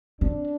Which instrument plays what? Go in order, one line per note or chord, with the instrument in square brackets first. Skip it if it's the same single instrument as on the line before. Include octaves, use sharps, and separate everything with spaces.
[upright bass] C4 [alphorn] D4